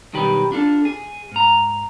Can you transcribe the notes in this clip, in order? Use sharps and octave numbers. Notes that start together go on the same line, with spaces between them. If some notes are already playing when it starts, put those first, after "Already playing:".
B1 D#3 G3 G4 B4
D4 F4 A4
G#4
G#2 A#5